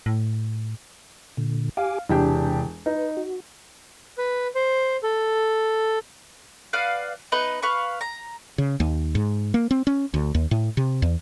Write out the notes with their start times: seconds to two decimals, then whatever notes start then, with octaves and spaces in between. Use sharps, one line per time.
0.06 A2
1.37 A#2 D3
1.77 G4 F5 G#5 D6
2.09 E1 C3 D4 G4
2.86 D#4 B4
3.17 F#4
4.18 B4
4.55 C5
5.03 A4
6.73 B4 D5 F5 F#5
7.32 B3 D#4 B4
7.63 B4 F5 C#6
8.01 A#5
8.58 C#3
8.80 D#2
9.15 G#2
9.54 A#3
9.71 C4
9.87 C#4
10.14 D2
10.35 D#2
10.51 A2
10.77 C3
11.02 E2